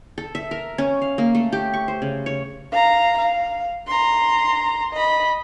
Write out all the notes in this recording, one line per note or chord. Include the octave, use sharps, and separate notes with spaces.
A4
E5
A#4
C#4
F5
A#3
A3
G4
C#6
C5
C#3
C#5
F5 A#5
F5
A#5 C6
D#5 B5